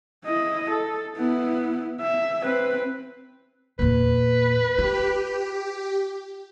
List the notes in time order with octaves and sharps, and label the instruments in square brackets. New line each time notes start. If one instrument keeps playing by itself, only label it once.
[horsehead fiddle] E4 D#5
A4
B3 E4
E5
C4 B4
[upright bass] E2 A#2 [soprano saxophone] B4
[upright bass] F4 [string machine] G4